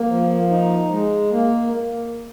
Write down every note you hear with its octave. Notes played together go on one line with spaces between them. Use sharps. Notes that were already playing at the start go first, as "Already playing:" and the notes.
Already playing: A#3
F3
D#4
G#3
A#3